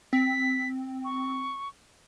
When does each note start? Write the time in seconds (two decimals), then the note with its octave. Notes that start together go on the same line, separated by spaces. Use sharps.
0.13 C4 B6
1.05 C#6